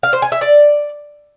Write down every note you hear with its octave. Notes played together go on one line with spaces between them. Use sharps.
F5
C5
G#5
E5
D5